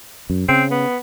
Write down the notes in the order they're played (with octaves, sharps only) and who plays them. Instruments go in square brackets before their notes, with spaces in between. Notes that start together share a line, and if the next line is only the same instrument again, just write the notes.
[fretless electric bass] F#2
[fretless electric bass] C#3 [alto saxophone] C4
[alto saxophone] B3